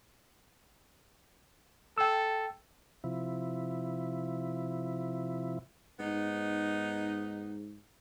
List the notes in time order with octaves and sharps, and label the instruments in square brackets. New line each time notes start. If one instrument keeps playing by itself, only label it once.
[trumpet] A4 [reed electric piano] G5 E6
[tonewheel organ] C3 F3 E4
[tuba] G#2 [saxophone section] B3 D#4